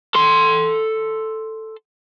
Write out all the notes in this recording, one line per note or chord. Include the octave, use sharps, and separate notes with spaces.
A4 C6